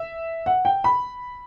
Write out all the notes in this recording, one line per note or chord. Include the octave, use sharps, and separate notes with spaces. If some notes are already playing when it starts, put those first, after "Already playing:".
Already playing: E5
F#5
G5
B5